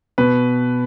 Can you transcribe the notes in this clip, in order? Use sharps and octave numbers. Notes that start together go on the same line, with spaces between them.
B2 B4